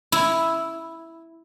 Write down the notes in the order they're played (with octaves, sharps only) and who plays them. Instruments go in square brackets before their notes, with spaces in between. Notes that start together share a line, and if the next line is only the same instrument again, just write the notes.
[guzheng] E4